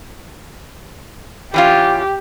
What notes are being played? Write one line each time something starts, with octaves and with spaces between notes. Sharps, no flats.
E3 C#4 F4 G4